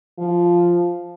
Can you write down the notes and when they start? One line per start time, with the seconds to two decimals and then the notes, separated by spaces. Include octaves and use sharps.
0.19 F3